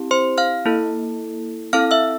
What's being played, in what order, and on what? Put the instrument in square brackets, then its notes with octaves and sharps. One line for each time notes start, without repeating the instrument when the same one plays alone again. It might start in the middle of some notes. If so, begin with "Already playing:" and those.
Already playing: [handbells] C4 E4 G4
C5 C6
F5 F6
A#3 E4 A4
C4 E4 A4 F5 F6
E5 E6